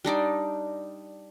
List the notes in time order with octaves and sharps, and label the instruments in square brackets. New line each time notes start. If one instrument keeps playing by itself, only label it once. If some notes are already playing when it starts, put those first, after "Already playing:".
[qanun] G3 D4 D#4 D5